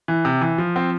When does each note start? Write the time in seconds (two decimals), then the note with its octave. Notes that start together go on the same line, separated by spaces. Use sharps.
0.08 E3
0.25 C3
0.41 E3
0.58 F3
0.76 C4